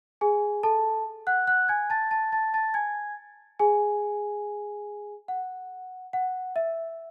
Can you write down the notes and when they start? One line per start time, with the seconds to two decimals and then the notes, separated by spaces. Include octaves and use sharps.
0.21 G#4 G#5
0.63 A4 A5
1.27 F#5 F#6
1.47 F#5 F#6
1.68 G#5 G#6
1.90 A5 A6
2.11 A5 A6
2.32 A5 A6
2.54 A5 A6
2.74 G#5 G#6
3.59 G#4 G#5
5.28 F#5
6.13 F#5
6.56 E5